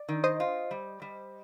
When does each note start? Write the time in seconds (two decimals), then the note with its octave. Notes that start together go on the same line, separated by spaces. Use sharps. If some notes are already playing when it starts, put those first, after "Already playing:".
Already playing: D5
0.09 D#3
0.24 C5 D#5
0.40 F4
0.71 G3
1.02 G3